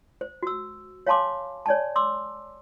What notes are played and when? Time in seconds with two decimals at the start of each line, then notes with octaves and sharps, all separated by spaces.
0.21 C5
0.43 F#4 E6
1.07 C#5 F5 G#5 A5 C6 D6
1.66 C#5 D5 G#5 A5
1.96 C6 D6 E6